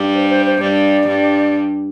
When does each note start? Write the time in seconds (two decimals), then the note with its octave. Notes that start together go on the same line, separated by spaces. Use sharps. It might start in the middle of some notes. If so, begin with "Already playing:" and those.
Already playing: G2 G3
0.15 C5
0.29 C5
0.46 C5
0.61 G2 G3 D5
1.07 G2 G3